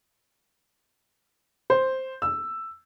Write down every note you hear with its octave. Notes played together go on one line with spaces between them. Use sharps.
C5
E6